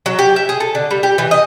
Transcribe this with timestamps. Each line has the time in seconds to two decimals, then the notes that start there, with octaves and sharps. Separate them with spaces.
0.06 F#3
0.19 G4
0.36 E5
0.49 G#4
0.60 A4
0.75 D3
0.91 G3
1.03 G4
1.18 E3
1.31 D#5